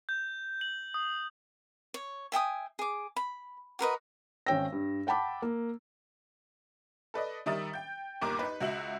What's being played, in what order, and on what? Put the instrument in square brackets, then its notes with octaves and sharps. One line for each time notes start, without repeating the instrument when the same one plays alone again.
[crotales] G6
F#7
D#6
[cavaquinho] C#5
E5 G5 G#5 D#6
G#4 D6
B5
F#4 A#4 B4 D#5
[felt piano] G#1 C#4 C#5 G5 E6 A#6
G2
F#5 G5 A5 B5 D6
A#3
[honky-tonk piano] A4 B4 D5 D#5
D#3 G3 E5 A#5 D#6 A6
G5 G6
G1 D#2 A#4 A#5 D6
D#4 B4
C#2 F#4 E5 F#7